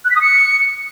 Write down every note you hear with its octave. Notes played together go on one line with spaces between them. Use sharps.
F#6
B6
D#6
C#7